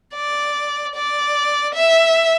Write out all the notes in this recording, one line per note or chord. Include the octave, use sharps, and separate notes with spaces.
D5
D5
E5